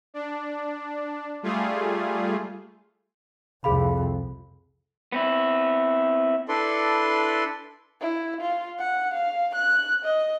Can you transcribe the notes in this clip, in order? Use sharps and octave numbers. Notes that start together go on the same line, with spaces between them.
D4
G3 A3 F4 G#4
C2 F2 G#4 F5 B5
B3 C4 E4
D4 E4 A4 B4 D5 C6
E4
F4
F#5
F5
F#6
D#5